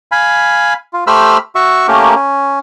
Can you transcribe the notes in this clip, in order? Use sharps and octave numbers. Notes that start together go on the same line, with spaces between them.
F5 G#5 B5
F4
A3 G4 C5 B5 E6 F6
F#4 E5 C#6
A3 A#3 C#4 G4 A#4
C#4